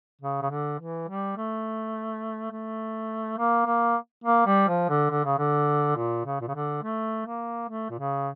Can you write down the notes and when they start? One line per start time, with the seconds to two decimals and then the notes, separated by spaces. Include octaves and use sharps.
0.21 C#3
0.42 C#3
0.50 D3
0.79 E3
1.08 G3
1.37 A3
2.51 A3
3.38 A#3
3.66 A#3
4.24 A#3
4.46 G3
4.68 F3
4.89 D3
5.10 D3
5.25 C#3
5.39 D3
5.97 A#2
6.25 C#3
6.41 A#2
6.48 C#3
6.54 D3
6.83 A3
7.26 A#3
7.69 A3
7.90 A#2
7.99 C#3